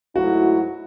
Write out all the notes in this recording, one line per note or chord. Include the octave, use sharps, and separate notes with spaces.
G#2 F#3 A3 E4 F#4